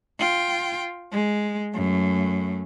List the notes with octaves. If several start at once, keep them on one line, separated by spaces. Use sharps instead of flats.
F4 G5
G#3
F#2 A3